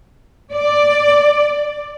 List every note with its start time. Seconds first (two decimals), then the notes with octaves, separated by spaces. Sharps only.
0.53 D5